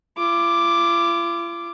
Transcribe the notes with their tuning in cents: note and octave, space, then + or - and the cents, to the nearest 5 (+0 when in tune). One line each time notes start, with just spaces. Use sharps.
F4 -45 D6 +0